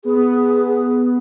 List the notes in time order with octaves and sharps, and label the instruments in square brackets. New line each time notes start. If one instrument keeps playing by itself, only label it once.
[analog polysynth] B3 [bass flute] G#4